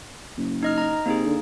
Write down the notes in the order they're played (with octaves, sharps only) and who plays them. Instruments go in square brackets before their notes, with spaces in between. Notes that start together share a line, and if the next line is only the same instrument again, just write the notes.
[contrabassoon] F#1
[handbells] D#4 D#5 F6
D#5 A#5
[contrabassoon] C3 [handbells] A#3 D#4 G#4
[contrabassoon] D3